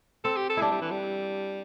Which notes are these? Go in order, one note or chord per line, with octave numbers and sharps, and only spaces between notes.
C4 A4
G4
A4
G3 D4 E4
G3
E3
G3